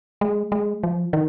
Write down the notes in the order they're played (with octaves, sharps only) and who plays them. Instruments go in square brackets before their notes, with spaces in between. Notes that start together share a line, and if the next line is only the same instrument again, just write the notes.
[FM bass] G#3
G#3
F3
D#3